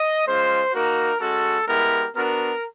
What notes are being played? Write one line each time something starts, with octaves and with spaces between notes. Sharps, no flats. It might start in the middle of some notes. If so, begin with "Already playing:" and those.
Already playing: D#5
G#3 C#4 F4 C5
A#3 D#4 F#4 A#4
G#3 C#4 F#4 A4
G#3 B3 E4 G4 A#4
B3 D4 F#4 A#4